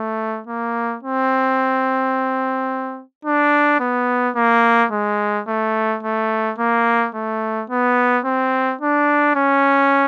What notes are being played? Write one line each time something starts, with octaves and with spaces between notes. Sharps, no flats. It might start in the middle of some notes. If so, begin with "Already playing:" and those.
Already playing: A3
A#3
C4
D4
B3
A#3
G#3
A3
A3
A#3
A3
B3
C4
D4
C#4